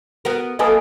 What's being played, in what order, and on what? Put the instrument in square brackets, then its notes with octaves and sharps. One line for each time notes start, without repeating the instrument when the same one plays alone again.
[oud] B3 F#4 A#4
[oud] A#3 A4 B4 [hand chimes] D#5 G#5 D#6